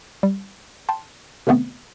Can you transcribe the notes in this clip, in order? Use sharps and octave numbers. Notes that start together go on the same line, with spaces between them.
G3
G5 A5 C6
C3 D#3 A3 B3 C4